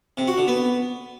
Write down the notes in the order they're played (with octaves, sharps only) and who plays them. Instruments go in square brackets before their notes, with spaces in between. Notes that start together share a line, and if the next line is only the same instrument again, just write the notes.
[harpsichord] C3
F#4
D3
B3